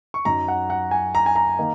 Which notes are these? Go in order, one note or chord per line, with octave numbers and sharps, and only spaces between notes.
C#6
F#2 F#3 D#4 A#5
F#5
F#5
G#5
A#5
G#5
A#5
D#3 A#3 D#4